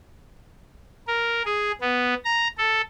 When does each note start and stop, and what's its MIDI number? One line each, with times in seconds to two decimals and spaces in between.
1.07 1.42 70
1.45 1.72 68
1.81 2.14 59
2.24 2.48 82
2.58 2.82 69